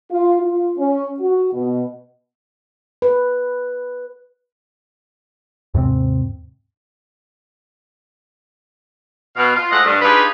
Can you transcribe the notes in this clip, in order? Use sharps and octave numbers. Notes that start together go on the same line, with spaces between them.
F4
F4
C#4
F#4
B2
B4
D#2 G#2 C3 C4
B2 F5
F4
G#3 A3 C5 D#5 F5 F#5
G2
D4 D#4 F4 G4 G#4 B4